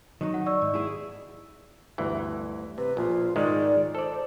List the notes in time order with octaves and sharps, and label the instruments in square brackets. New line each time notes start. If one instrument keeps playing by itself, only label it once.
[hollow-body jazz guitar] D#3 F#3 D#4
[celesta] F#5
D5 C#6 E6
[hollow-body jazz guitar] G#2
E4 G#4
[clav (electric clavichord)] G1 D2 E3
[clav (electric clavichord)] C3 [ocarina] B4
[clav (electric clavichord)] A#1 [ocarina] F4
[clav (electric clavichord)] G#2 D#3 G#3 [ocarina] D5
[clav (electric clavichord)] A4 D5 [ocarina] C5